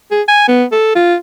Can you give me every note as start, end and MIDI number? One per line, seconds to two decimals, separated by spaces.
0.11 0.22 68
0.28 0.44 80
0.48 0.64 59
0.72 0.91 69
0.95 1.15 65